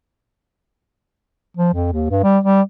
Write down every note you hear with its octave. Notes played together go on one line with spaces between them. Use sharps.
F3
F2
D#2
G2
G3
G3